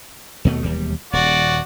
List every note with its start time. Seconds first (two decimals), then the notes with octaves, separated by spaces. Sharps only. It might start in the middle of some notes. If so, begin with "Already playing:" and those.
0.45 D#2 B2 A3
0.63 E1 D#2 G3
1.13 D#1 F#4 D5